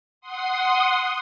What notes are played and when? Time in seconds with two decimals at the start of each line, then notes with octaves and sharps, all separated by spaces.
0.21 F#5 C6 D#6